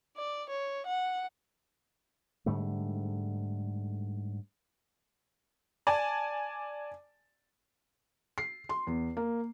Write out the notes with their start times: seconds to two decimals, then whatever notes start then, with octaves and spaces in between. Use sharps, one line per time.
0.17 D5
0.50 C#5
0.86 F#5
2.46 G#2 D3 G3 A3
5.87 D5 G#5 A5
8.38 C7
8.69 C6
8.87 E2
9.17 A#3